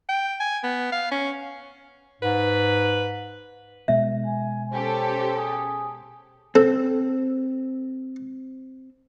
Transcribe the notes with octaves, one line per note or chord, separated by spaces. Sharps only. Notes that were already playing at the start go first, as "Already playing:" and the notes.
G5
G#5
B3
F5
C#4
G#2 B4
B2 G#3 B3 E5
G#5
C#4 G4 A4 C5
G#4
C4 A4